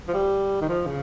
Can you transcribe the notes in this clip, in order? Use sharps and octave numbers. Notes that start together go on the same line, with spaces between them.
F3
G3
D#3
F3
C#3